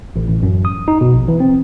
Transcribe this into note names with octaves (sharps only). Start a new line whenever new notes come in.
A1
A1
F#2
D#6
D#4
B2
A#1
E3
C4